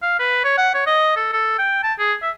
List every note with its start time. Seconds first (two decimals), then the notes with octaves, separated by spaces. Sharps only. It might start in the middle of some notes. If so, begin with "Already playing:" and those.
0.02 F5
0.20 B4
0.44 C#5
0.58 F#5
0.75 C#5
0.87 D#5
1.16 A4
1.33 A4
1.58 G5
1.83 A5
1.99 G#4
2.22 E5